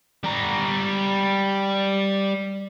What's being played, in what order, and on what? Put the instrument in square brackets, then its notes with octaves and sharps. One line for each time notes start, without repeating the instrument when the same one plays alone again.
[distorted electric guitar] G3 A#5